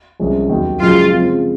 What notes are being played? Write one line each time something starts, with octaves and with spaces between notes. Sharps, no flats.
C2 C3 F3 G#3 C#4
D#2 D#3 F#3 A#3
F#2 C#3 F3 G#3 F4
C#3 F3 G#3 C4 F4